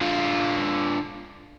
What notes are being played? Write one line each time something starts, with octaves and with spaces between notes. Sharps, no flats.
D3 F4